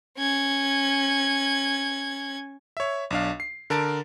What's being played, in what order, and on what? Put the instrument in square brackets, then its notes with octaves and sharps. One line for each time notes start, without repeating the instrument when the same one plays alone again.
[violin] C#4 G#6
[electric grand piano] C#5 E5
B1 D4 F5
C7
D3 A#4 A5 A6 D7